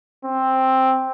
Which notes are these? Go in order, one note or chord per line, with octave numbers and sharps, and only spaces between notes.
C4